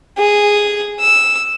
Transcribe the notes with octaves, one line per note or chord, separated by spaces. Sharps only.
G#4
E6